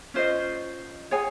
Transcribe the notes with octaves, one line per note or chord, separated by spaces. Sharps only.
C#4 F4 C5 D#5
G#4 C#5 G#5